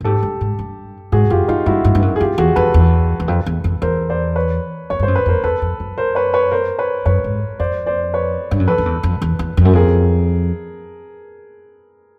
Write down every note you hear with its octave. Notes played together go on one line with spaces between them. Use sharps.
A2
G#2 G4 A4
G2
G#2
G2
G#2 F#4 G#4
F#2 F4 G4
G2 D#4 F4
G2 E4 F#4
G2
G2
F#2
G#4
F#2 F4 G4
E2 F#4 G#4
F2 A4 B4
E2
E2
F2
E2
F2
E2 A#4 C5
C5 D5
B4 C#5
F2 C#5
G2 C5
F#2
B4
F2 A#4 C5
E2 A4 B4
F2
F#2
A#4 C5
B4 C#5
B4 C#5
A#4 C5
B4 C#5
F#2 B4 C#5
G#2
F2 C5 D5
C5 D5
B4 C#5
G2
F#2
F2 A4 B4
F2
E2
F2
E2
E2
F2
F#2
F2 G#4 A#4